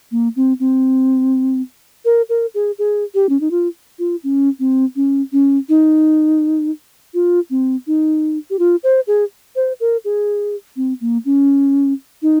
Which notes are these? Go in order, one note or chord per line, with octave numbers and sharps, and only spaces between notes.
A#3
C4
C4
A#4
A#4
G#4
G#4
G4
C#4
D#4
F4
F4
C#4
C4
C#4
C#4
D#4
F4
C4
D#4
G4
F4
C5
G#4
C5
A#4
G#4
C4
A#3
C#4
D#4